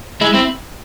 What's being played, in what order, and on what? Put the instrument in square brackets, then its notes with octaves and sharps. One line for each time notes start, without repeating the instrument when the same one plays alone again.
[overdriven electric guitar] G#3 [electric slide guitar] E4
[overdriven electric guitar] C4 [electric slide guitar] E4